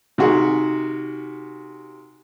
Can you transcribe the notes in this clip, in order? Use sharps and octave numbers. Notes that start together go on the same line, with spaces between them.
C3 D#3 F#4 G#4